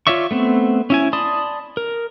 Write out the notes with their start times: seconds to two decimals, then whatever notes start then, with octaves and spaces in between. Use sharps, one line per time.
0.07 F4 C#5 D5 E5 C#6
0.31 A3 B3 C4
0.90 C#4 E4 G#5
1.13 D5 A5 B5 C6 D#6
1.77 A#4